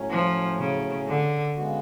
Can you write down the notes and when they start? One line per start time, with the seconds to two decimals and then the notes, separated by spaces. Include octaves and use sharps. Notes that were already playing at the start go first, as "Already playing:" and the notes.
Already playing: A2 F#3 C#4
0.10 F3
0.59 C#3
1.08 D3
1.57 C#3 G#3 B3 F#4